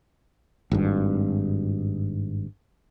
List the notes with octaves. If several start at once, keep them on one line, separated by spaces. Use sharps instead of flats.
G#1 G2